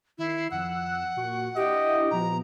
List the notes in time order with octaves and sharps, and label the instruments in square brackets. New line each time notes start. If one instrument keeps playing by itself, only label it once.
[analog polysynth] D#3 C7 [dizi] E4
[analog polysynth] F2 E6 F#6 [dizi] F#5
[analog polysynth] A#2 F#4 C#6
[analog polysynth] D4 E4 E5 [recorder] G4 [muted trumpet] D#5
[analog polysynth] A#2 F3 B3 [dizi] A#5